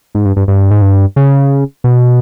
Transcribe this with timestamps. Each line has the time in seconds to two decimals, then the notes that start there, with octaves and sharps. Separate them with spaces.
0.15 G#2
0.25 G2
0.36 G2
0.48 G2
0.71 G#2
0.82 G2
1.16 C#3
1.84 B2